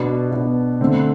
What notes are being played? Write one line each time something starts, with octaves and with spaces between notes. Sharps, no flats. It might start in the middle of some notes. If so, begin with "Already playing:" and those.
Already playing: B2 B3 D4
B2 B3 D4
D3 A3 C4